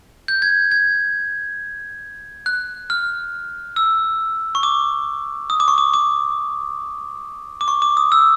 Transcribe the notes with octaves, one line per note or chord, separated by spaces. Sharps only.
G6
G#6
G#6
F#6
F6
E6
C#6
D6
D#6
D6
C#6
D6
D6
D6
C#6
D6
D#6
E6